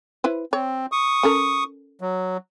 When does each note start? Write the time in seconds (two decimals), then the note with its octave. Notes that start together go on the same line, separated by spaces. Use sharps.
0.24 E4 B4 C5
0.53 C4 C#5
0.92 C#6 D#6
1.23 C#4 A4 A#4
2.01 F#3